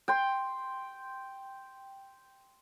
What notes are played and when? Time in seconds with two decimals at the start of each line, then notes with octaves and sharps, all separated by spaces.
0.08 G5 C6